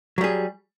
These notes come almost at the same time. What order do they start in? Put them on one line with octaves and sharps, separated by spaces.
F#3 G3 G#4